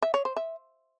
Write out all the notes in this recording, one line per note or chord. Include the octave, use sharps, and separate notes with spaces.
E5
C#5
C5
E5